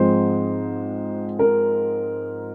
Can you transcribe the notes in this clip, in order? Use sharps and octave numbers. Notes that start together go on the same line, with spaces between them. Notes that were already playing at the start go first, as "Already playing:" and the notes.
Already playing: G#2 F3 G#3 C4 C5
A#4